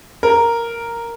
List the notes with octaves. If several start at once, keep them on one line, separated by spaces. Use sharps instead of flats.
A#4